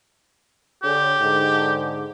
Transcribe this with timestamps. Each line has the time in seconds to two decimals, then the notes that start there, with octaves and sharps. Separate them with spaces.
0.83 D3 G4 G#4 C#5
1.21 G#2 D3